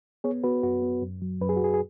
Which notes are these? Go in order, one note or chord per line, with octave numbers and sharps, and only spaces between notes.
B3 G#4 C#5
B3 F#4 B4
F#2 F#4
B3
F#2
F#3
F#2 B4
G#4
F#4
F#2 G#4
G#4